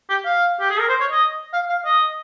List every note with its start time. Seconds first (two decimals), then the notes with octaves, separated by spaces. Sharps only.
0.09 G4
0.25 F5
0.60 G4
0.70 G#4
0.80 A#4
0.89 C5
1.00 C#5
1.11 D#5
1.53 F5
1.69 F5
1.85 D#5